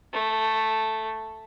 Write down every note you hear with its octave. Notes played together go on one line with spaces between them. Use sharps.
A3